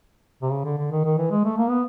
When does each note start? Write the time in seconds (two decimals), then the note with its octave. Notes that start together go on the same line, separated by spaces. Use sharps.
0.42 C3
0.51 C#3
0.64 D3
0.77 D3
0.91 D#3
1.04 D#3
1.18 E3
1.31 G#3
1.44 A3
1.58 A#3
1.69 B3